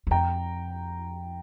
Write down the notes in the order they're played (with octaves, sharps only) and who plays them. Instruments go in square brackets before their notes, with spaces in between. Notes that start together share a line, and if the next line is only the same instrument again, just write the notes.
[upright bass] E2
[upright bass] F2 [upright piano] G5 A#5